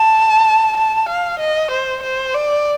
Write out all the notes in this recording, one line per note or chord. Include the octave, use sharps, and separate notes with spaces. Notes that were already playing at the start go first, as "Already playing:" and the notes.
Already playing: A5
A5
F5
D#5
C5
C5
D5